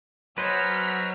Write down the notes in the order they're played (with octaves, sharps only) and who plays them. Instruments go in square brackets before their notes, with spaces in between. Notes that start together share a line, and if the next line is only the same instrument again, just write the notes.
[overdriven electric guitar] F#3 [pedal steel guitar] B4 C5 [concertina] D#5 F#5 G#5 [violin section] F6 B6